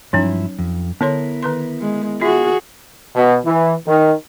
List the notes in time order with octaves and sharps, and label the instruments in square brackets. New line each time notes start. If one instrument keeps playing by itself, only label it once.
[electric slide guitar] G2 F3 E4 [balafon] F#3 C#4 D#4
[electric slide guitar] F2
[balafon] D3 C#5 C6 [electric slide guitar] B3 E4 A#4
[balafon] D#3 B4 C6
[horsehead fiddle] G#3
[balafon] F4 E5 [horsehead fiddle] F#4 G#4
[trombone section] B2
E3
D#3